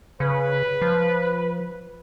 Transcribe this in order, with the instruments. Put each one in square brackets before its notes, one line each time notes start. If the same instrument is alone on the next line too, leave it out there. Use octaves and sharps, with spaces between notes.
[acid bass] C#3 [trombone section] B4
[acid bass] F3